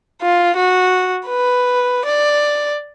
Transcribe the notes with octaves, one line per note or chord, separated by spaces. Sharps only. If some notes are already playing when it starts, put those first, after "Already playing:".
F4
F#4
B4
D5